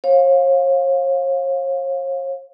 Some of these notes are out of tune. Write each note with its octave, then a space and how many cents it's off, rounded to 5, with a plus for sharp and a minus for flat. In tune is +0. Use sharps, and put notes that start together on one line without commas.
C#5 -45 F5 +15